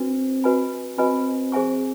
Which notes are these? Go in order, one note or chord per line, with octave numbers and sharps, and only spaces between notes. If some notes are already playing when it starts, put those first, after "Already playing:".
Already playing: C4 D4 F#4 B4
F#4 B4 D#5 G#5 B5
C4 F#4 B4 D#5 G#5 B5
G#4 C5 E5 G#5 C#6